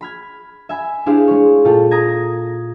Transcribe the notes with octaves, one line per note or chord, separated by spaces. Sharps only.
B5 F6 G#6
E5 G#5 B5
D4 E4 G4 G#4 C5 F5
G#3 C#5
A#2 F4 A4 G5
A#5 D#6 G#6 A#6